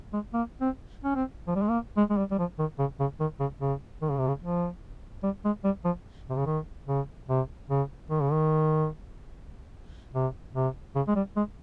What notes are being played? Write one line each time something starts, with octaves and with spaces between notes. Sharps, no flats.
G#3
A#3
C4
C#4
C4
F3
G3
G#3
A#3
G#3
G#3
G3
G3
F3
D#3
C#3
C#3
D#3
C#3
C#3
D#3
C#3
C3
C#3
F3
G3
G#3
G3
F3
C3
C#3
D#3
C#3
C3
C#3
D#3
C#3
D#3
C3
C3
C#3
G#3
G3
G#3